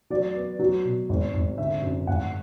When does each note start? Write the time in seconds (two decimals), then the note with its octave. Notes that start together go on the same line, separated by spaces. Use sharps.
0.10 F#3 D5
0.35 B3
0.59 F#3
0.85 B2
1.09 G#1
1.34 G#1
1.58 D3 E5
1.82 F#2
2.07 G#1 F#5